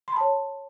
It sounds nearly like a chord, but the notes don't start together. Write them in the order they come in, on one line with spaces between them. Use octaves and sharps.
C6 B5 A5 C#5